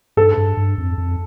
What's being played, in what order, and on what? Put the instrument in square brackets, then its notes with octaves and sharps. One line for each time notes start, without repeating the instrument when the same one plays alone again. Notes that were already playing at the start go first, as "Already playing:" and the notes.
[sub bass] G2 [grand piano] A4
[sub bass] G2
G2
F2
F2